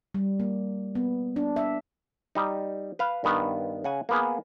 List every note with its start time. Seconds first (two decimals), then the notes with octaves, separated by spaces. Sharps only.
0.14 G3
0.40 A#3
0.95 B3
1.36 D4
1.56 E5
2.35 G3 D#4
2.99 B4 F5
3.24 G2 D#3 B3
3.84 C#3 F#5 G#5
4.09 A#3 B3 G#4